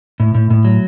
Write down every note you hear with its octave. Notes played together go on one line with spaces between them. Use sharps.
A2
A2
A2
F#3